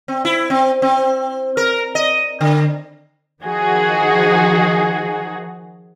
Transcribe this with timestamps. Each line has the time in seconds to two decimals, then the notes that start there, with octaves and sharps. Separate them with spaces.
0.08 C4
0.25 E4
0.50 C4
0.82 C4
1.57 A#4
1.95 D#5
2.41 D3
3.42 D#3 F3 D#4 F#4 G#4